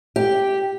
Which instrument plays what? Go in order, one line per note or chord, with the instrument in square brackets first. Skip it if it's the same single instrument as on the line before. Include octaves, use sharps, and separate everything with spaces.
[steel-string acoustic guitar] G4